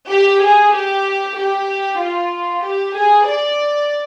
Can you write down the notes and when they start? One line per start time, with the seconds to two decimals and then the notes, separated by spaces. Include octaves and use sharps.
0.11 G4
0.43 G#4
0.75 G4
1.37 G4
2.00 F4
2.64 G4
2.95 G#4
3.27 D5